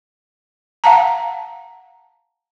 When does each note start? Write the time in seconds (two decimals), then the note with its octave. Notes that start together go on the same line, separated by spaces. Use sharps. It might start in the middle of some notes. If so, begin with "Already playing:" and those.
0.84 F5 F#5 A5 A#5